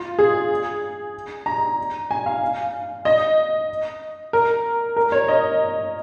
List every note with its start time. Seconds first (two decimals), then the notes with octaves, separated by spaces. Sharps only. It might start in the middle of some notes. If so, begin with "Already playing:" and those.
Already playing: F4
0.19 G#4
1.46 A#5
2.11 G#5
2.26 F5
3.05 D#5
4.33 A#4
4.96 A#4
5.12 C#5
5.28 D#5